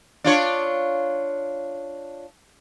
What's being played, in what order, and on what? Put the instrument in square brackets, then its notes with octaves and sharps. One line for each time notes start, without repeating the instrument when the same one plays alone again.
[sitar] D4 F4 C#5